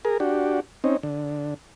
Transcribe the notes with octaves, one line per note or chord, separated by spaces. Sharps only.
G#4 A#4
D4 F#4 G4
C4 C#4 D#4
D3